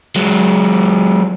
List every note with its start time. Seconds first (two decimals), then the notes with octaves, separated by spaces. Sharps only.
0.16 F#3 G#3